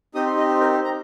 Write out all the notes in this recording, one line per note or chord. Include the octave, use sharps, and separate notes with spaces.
C4 D#4 G4 D#6
C6
D#5
C5
A#4
C5
A#5